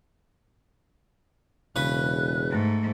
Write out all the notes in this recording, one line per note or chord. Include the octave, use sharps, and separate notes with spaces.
E1 C#3 B4 F#6
G#2 A3